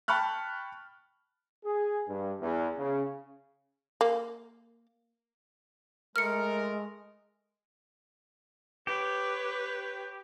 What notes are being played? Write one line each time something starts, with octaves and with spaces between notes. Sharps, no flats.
G5 A5 B5 C#6 F6 F#6
G#4
G2
E2
C#3
A#3
G#3 A3 A#4 F6 C#7
G4 B4 C#5